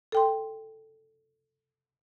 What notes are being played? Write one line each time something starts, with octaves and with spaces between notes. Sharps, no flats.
A4 G5 C6